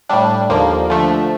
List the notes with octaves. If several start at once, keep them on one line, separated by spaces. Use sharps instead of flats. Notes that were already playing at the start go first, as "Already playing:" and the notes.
A2 G3 D4
D#2 D3 F3 A#3
D3 F3 A3